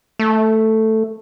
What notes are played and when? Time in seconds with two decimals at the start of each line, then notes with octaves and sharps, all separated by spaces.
0.19 A3